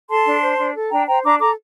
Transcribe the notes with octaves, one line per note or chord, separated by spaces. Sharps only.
A4 A5 C6
D4
C5
D4
A4
D4 G5 A#5
C5 G5 A#5
D4 A#5 D6
A4 A#5 D6